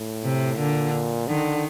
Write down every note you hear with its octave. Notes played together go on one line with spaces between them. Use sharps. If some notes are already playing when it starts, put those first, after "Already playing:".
Already playing: A2
C3
A#2 D3
D3 D#3